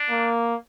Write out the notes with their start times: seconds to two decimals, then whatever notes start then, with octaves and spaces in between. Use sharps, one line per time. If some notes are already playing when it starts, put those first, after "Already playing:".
Already playing: D4
0.10 A#3